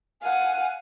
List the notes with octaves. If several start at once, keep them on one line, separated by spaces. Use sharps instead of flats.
F5 F#5 G#5